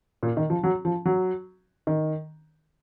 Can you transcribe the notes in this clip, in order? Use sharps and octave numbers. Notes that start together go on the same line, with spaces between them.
A#2
D#3
F3
F#3
F3
F#3
D#3